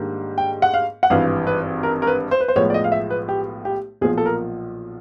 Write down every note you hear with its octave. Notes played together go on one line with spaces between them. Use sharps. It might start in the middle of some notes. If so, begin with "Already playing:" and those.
Already playing: G#2 D#3 G3 A#3 D4
G5
F#5
F5
F#5
G#1 G2 E3 F5
B4
A#4
A#4
B4
C5
B4
C5
B1 A2 F3 G#3 B3 C#5
D5
D#5
F5
E5
B4
G4
G4
B1 A#2 F3 G#4
A4
A#4